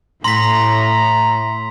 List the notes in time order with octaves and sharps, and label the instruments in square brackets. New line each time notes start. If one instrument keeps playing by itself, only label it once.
[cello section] A2 [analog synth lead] A#5 [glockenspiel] C6 B6